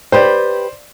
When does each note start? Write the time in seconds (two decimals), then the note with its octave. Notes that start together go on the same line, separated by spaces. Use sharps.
0.12 G4 B4 C5 D5 G5